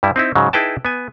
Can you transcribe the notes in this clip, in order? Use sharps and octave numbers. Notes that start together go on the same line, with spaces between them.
G2 G3 E4
C4 D#4 E4
G#2 C#3 F#3
D#4 E4 G#4 B4 G5 A5
B3 G#5